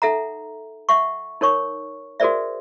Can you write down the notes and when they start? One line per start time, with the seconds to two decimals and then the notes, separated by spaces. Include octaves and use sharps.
0.02 D#4 A4 E5 F#5 A#5
0.89 E5 F#5 C#6
1.41 D#4 A#4 C#5 C#6
2.20 F#4 G#4 A#4 C5 D5 E5